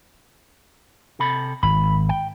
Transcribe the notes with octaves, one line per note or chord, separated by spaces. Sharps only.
C3 A4 B5
G#1 B5
G5